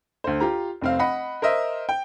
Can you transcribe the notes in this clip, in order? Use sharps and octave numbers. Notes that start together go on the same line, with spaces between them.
D2 C5
F4 G4 A#5
F1 C4 F5
D#5 F#5 B5
A#4 C5 D#5 E5
G5